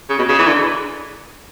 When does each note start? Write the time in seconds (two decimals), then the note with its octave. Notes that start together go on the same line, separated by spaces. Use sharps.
0.09 C#3
0.18 B2
0.29 C#3
0.39 E3
0.48 D3